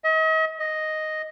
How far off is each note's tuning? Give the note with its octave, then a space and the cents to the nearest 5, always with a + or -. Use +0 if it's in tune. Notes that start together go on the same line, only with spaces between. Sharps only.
D#5 +40
D#5 +0